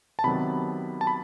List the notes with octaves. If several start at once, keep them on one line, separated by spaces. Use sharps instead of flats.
A5
C3 D#3 F#3 B3 B5
A5
B5